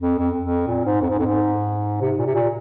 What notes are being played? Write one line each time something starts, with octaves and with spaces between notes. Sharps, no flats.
F2
F2
F2
A#2
G#2
F2
G#2
F2
G#2
C3
A#2
C3
A#2